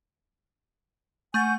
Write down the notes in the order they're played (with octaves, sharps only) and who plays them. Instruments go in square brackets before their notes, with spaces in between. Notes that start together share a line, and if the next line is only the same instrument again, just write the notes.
[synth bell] A3 C#6 A6 [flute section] F#5 G#5 G6